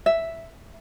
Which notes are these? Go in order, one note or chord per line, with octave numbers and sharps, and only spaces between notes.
E5